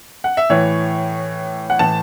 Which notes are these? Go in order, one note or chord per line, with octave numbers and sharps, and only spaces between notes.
F#5
E5
A2 E3 C#5
F#5
A2 E3 A5